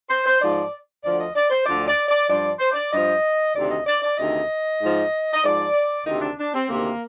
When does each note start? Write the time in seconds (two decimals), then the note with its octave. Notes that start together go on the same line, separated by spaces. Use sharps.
0.09 C5
0.25 C5
0.40 G#2 F3 D5
1.03 D2 D3 F3 D5
1.19 D#5
1.35 D5
1.50 C5
1.66 D2 D3 F3 D5
1.87 D5
2.08 D5
2.28 G2 F3 D5
2.59 C5
2.71 D5
2.92 G2 F3 D#5
3.54 D2 C3 D#3 D5
3.70 D#5
3.86 D5
4.02 D5
4.17 D2 C3 D#3 D#5
4.80 G#2 F3
5.32 D#5
5.43 G#2 F3 D5
6.05 D2 C3 D#3 D#4
6.21 D4
6.38 D4
6.53 C4
6.69 D2 C3 D#3 A#3